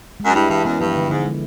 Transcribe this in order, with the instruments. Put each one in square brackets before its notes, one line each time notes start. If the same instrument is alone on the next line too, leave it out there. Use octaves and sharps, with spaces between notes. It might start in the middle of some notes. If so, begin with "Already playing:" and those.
[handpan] G#3
[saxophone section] F#2
[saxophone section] G2 [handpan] E4
[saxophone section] G2 [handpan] E3
[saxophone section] F#2 [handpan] B3
[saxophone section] G2 [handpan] F3
[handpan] D3
[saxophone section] G#2 [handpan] D3
[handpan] G#3